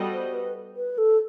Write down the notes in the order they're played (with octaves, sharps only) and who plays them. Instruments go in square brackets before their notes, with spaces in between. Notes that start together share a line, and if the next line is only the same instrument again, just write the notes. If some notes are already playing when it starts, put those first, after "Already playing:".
Already playing: [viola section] G3 B3 F#4 A4 D#5
[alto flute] C5
B4
B4
A4